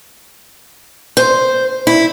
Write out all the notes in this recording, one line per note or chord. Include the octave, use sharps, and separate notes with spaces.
C5
E4